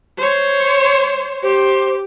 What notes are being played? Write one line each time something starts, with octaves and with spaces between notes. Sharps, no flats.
C5 C#5
G4 C5